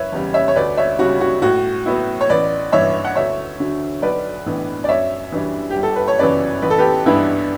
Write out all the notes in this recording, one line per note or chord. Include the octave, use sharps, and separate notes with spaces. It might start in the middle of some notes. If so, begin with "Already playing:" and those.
Already playing: F#1 B4 C#5 E5
E2 C#3 G3
C#5 E5
C#5
D2 B4 D5
C#5 E5
C#3 G3 C#4 F#4
F#4
A2 F#4
F#3 B3 E4
C#5
A1 B4 D5
G2 E3 C#5 E5
F#5
D2 C#5 E5
D3 F#3
B1 B4 D5
A2 E3 B3 D4
D5
F#2 C#5 E5
E3 G3 D4
G4
G1
A4
B4
C#5
F#2 C#3 E3 B4 D5
A1 B4
A4
G4 B4
G2 E3 B3 D4 E4